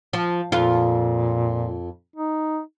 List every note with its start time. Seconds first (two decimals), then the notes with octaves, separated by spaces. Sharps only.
0.13 F3
0.52 F2 A#2 F4
2.16 D#4